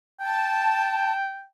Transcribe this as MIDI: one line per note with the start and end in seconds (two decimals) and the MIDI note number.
0.20 1.45 79
0.20 1.13 81